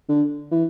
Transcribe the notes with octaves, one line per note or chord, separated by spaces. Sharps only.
D3
E3